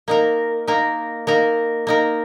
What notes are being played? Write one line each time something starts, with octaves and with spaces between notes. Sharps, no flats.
A#3 D#4 A#4
A#3 D#4 A#4
A#3 D#4 A#4
A#3 D#4 A#4